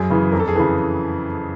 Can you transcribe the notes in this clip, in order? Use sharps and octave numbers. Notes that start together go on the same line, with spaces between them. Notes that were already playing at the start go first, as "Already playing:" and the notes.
Already playing: F#2 G#4
C#3 E3
F2 A#4
A4
G#4
C#3 E3 A4